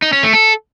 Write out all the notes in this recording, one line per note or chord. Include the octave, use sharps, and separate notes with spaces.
D#4
C#4
A3
A4